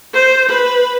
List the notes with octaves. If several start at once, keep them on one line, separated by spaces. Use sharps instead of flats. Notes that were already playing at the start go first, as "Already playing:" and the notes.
C5
B4